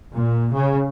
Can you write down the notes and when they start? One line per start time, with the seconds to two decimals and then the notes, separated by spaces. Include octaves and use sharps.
0.14 A#2
0.53 C#3